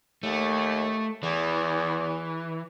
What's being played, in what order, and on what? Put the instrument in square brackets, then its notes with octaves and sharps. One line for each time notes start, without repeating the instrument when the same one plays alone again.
[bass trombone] D#2 [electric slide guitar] A3
[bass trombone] E2 [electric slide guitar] E3